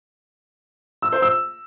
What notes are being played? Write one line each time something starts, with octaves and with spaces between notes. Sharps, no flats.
E6
C5
E6